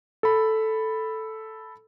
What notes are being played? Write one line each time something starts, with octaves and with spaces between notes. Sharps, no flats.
A4 B5